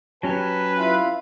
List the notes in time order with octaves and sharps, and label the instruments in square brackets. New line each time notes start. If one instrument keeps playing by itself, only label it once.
[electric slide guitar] F#3 C#4 G4 [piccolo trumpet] B4 [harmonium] G#5 A5
[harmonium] E4 F4 F5